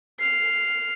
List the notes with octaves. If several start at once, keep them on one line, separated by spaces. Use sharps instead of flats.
F6 C7